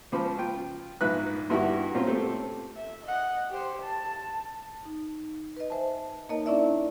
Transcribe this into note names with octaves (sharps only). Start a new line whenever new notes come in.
C#2 C#3 F3 C5 B5
F4 G5
A#1 G#2 D#4 B4 E5 F#6
G2 D3 E4 F#4 G4 C#6
A#2 C4 C#4 F4
A3 C4 G4 A4
E5
D#5 F#5
G4 C5
A5
D#4
B4 D#5
C5 E5 G#5 A5
A#3 D#4 A#4 C#5 D#5 A5
C#4 D4 E4 D5 E5